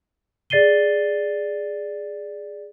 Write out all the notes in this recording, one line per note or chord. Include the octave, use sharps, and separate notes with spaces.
G#4 D5 A6 C7 D#7 G7